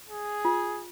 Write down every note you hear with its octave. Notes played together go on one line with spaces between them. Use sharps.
G#4
F4